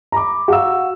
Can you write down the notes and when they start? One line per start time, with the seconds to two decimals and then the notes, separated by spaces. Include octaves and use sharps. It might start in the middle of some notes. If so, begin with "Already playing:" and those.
0.12 A#5 B5 D6
0.48 F#4 F5 E6